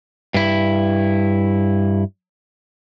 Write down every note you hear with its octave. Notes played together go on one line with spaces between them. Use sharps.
G2 E4